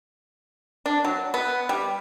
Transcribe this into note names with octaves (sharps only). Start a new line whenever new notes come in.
D4
F#3
B3
G3